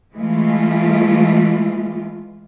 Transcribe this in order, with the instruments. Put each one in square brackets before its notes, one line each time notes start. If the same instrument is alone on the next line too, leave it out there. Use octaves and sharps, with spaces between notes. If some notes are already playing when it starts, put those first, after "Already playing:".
[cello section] E3 G#3 A3 F4